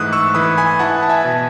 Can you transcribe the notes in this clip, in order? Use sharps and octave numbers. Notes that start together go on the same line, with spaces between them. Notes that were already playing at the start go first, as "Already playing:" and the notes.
Already playing: G#2 E3 A3 D#6 F#6
C#6 E6
E3 B5 D#6
G#5 B5
E4 F#5 A5
A5
E5 G#5
B2